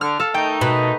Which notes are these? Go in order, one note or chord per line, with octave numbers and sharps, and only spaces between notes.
D3 F6
A4 F5
D#3 A3 D#4 G5
B2 B4